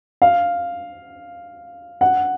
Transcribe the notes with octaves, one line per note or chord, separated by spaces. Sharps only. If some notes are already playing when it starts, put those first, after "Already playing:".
F5
F#5